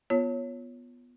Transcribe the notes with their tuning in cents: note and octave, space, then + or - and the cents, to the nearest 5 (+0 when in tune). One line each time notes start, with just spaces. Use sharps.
B3 -5 F4 +0 C#5 +0